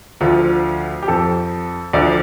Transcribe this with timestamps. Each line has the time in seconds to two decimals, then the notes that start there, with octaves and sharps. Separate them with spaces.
0.21 D2 D3 F3 F4
1.03 G4
1.08 F2 F3 A4
1.93 D2 D3 F3 D5